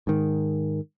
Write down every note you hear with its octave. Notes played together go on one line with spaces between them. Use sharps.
G#2 D#3